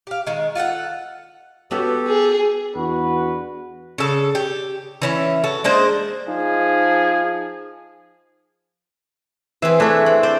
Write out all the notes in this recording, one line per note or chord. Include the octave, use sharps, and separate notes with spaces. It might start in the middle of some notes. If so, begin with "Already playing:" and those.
G4 F5
D#3 G#3
F4 A4 F5 F#5
B3 C#4 F#4 G4 A4
G#4
E2 D4 F#4 B4
C#3 A4
G4
E3 C#4 E4
F#4 A4
G#3 A#3 D4 C5
F3 D#4 G#4
E3 C4 G#4 E5
E3 A3 D4 A4 C#5
C4
C5 D5